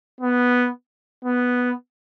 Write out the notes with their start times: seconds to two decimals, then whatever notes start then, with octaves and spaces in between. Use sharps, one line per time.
0.20 B3
1.24 B3